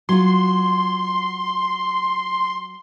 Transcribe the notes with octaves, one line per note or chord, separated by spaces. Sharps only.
F#3 F4 C6